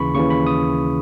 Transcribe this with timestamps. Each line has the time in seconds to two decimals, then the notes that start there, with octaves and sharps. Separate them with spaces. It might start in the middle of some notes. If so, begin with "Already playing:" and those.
Already playing: D#2 C#3 E3 B5 C#6
0.15 D#2 C#3 E3 C#6
0.30 B5
0.46 D#6